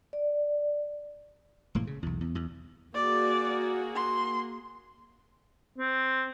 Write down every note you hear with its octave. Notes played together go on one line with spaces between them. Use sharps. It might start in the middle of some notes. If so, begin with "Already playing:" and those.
D5
E1 A2 A#3
C#3
B1 E2
E2
E2
A#3 F#4 G#4 D5
C6
C4